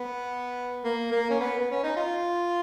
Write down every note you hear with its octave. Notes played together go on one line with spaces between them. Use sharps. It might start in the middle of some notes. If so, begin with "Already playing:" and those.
Already playing: B3
A#3
A#3
C#4
B3
B3
C#4
D#4
F4